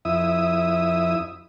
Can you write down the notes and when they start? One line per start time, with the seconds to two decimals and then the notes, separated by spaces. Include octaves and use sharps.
0.05 F2 E4 E5 D#6